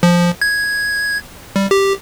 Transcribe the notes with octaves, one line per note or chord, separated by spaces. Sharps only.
F3
G#6
G3
G4